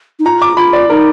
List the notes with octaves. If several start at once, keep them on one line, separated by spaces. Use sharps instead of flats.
D#4
F4 A#5
D6
F4 B5
D5
D#4 A#4